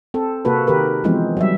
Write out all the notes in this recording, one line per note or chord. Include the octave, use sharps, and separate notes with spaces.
C4 A4
C3 A#3 F#4 A4 B4
D#3 G4 A#4 B4
E3 F3 G#3 B3 C4
F#3 G3 E5